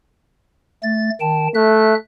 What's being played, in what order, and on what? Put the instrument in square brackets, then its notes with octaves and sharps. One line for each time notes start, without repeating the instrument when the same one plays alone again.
[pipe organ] A3 A6
D#3 G5 A5
[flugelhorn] A3 [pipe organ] E5 F#6